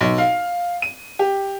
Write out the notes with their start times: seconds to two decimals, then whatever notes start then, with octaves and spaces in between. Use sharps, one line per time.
0.01 B1
0.18 F5
0.82 D#7
1.19 G4